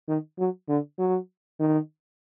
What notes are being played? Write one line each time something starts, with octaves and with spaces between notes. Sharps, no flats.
D#3
F#3
D3
F#3
D#3